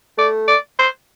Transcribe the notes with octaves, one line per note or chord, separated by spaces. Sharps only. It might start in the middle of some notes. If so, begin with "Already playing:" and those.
A3 D5
D5
C5